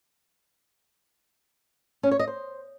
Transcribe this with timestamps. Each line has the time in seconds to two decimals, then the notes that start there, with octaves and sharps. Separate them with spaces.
2.03 C#4
2.11 C#5
2.19 D#5
2.28 C5